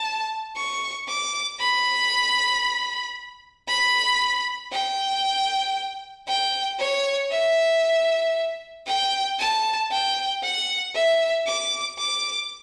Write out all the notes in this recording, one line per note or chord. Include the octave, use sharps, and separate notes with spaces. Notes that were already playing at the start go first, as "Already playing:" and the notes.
Already playing: A5
C#6
D6
B5
B5
G5
G5
C#5
E5
G5
A5
G5
F#5
E5
D6
D6